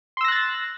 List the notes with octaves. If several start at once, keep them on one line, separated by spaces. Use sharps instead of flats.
C6 E6 F#6 A6 A#6